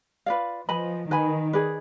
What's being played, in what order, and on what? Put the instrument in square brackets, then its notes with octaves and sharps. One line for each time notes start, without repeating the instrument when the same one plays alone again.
[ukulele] F4 B4 D5 F5
[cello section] F3 [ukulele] B4 D#5 G#5 B5
[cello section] D#3 [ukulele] B4 D#5 G#5 B5
[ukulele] D#4 G#4 B4 D5